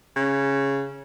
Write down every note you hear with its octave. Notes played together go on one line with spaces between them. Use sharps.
C#3